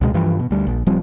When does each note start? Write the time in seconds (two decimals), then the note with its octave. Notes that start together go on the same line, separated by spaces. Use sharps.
0.01 C#2 B2 G#3
0.14 G2 E3 F3
0.39 B2
0.51 D2 G3
0.67 A#1
0.87 D#1 F3 G3 C4